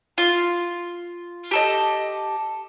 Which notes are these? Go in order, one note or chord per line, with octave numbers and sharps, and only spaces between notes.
F4
G4 A4 D#5